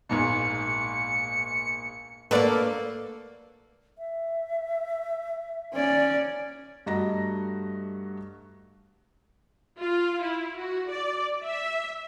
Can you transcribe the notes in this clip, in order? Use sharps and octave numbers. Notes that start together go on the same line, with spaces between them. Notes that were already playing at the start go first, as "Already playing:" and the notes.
A#1 G#2 B2 C#7
F#3 A#3 D4 A4 B4 D5
E5
C#4 D5
G2 A3 F#4 D#5 A#5 A#6
F4
E4
F#4
D5
E5